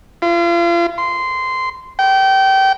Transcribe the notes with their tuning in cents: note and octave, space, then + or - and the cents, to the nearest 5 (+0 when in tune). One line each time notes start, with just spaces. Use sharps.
F4 -35
C6 -15
G5 -25